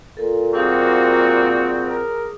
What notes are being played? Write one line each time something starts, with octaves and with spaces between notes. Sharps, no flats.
A#2 A4 A#4
G3 A#3 C4 F#4 G#4 D6 D#6
A#4